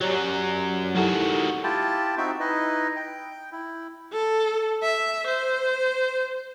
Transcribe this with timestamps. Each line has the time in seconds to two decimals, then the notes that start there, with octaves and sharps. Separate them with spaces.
0.01 F#2 F#3 G4 C#5 D5
0.95 D#3 E4 F#4 G4 A4
1.64 E4 F4 G4 G5 A5
2.17 C4 D#4 F#4 E5 G5
2.40 D#4 E4 B4 D#5
2.96 G5
3.52 E4
4.12 A4
4.82 E5
5.27 C5